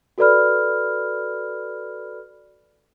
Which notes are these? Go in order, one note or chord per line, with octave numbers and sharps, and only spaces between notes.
F#4 A4 B4 D5 B5 F6